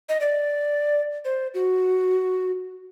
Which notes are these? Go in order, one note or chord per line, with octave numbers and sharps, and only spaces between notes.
D#5
D5
C5
F#4